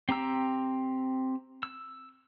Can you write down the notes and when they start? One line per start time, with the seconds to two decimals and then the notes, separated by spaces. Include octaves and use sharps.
0.09 C4 G4 A#5 E6
1.63 E6